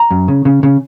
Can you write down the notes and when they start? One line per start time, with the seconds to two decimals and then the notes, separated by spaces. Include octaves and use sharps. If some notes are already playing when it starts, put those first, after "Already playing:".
Already playing: A#5
0.11 F#2
0.28 C#3
0.45 C#3
0.63 C#3